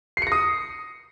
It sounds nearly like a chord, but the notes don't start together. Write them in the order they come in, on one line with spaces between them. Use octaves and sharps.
C7 C#7 A#6 D#6